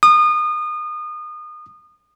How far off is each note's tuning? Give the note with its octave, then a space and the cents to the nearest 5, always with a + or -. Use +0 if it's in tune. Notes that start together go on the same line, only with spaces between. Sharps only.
D#6 -30